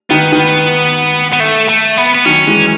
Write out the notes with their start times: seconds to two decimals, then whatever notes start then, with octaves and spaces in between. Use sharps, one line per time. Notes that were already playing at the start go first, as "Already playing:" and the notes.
0.10 D#3 B3
0.32 D#3
1.33 B3
1.40 A3
1.69 A3
1.97 B3
2.14 B3
2.25 D#3 F#3 C#4
2.47 E3 G#3